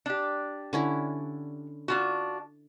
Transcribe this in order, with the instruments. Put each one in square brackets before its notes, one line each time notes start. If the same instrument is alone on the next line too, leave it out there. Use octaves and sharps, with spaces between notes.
[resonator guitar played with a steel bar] D4 G4
[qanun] D3 C#4 E4
[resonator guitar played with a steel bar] D4 F4 F#4